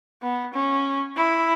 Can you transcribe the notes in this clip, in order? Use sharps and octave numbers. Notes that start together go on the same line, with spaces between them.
B3
C#4
E4